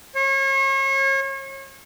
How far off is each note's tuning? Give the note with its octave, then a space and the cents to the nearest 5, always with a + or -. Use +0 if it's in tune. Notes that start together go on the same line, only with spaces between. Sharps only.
C#5 -35